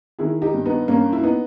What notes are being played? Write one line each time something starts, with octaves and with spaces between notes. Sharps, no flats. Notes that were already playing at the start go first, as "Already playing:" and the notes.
D#3 E4 G#4
D#4 G4
G2
B3 D#4
G2 A#3 C#4
E4
B3 D#4